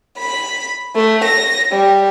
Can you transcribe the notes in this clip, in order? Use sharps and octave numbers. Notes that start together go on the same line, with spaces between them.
B5
A3
A#6
G3